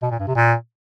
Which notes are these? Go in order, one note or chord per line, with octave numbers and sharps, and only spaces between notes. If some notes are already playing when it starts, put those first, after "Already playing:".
B2
A#2
G2
C3
A#2